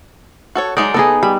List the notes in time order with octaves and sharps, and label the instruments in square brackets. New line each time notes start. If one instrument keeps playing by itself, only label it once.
[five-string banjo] F#4 A4 C#5
[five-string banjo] F#3 G#3 D#4 [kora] D5
[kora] B3 D#4 G#4 [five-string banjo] A4
[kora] G3 [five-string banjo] B5